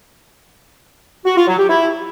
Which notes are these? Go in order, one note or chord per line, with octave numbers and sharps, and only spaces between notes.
F#4
F4
F#3
G4
E4